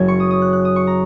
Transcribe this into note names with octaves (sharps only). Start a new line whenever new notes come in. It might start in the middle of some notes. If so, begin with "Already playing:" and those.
Already playing: F#1 F#2 F#3 G#6
C#6
D#6
D#6
F#6
F#6
D#6
C#6
A#5